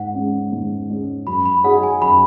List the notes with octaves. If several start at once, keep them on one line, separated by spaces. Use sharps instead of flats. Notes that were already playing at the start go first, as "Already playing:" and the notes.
Already playing: G#2 F#5
G#3 C#4
G#2
G#3 C#4
F#2 B5
B5
F#3 D#4 G#4 C#5 F#5
G#5
F#2 B5